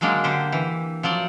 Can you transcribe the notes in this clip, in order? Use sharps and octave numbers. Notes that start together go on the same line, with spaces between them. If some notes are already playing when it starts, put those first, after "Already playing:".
D3 F#3 G#3 A#3 D4
D3 G4 C5
E3
F3 F#3 D5 F#5